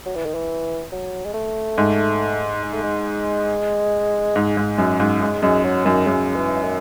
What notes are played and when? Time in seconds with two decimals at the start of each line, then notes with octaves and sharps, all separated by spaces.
0.06 F#3
0.16 E3
0.26 D#3
0.35 E3
0.92 F#3
1.25 G#3
1.34 A3
1.78 G#2
2.63 G#3
2.74 A3
2.83 G#3
4.36 G#2
4.57 G#2
4.78 F#2
5.00 G#2
5.21 G#2 G#3
5.42 F#2 G#3
5.64 F#3
5.85 F#2 D#3
6.07 F#2 C#3
6.36 E3
6.64 D#3